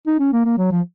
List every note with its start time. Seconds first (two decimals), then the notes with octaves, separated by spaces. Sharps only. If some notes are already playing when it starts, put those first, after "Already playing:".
0.07 D#4
0.20 C#4
0.33 A#3
0.45 A#3
0.58 F#3
0.72 F3